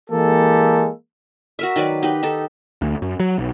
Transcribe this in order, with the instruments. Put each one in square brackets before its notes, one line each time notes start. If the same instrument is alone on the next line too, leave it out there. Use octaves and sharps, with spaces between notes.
[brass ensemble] E3 G#3 A#3 G4 A4
[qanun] F#4 A#4 E5
D#3 F#3 B4 D5
D#4 G4 B4
D#4 A4
[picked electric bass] D2
F#2
F#3
B1